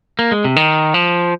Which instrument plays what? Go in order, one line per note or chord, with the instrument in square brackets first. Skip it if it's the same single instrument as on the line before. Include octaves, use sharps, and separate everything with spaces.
[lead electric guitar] A#3
G#3
C3
D#3
F3